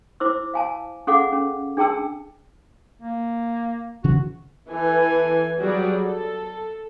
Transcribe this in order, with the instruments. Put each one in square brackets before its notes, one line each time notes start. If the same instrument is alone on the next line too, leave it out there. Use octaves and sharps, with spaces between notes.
[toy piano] E4 C5 D6 E6
F5 G#5 A5
C#4 G#4 A4 F5 F#5 D6
C#4
D4 G#4 G5 A5 E6
[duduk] A#3
[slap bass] C#3 E3 F3 [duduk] F#4
[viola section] E3 A4 G#5
F#3 G3 F#4 G#4 D5
A4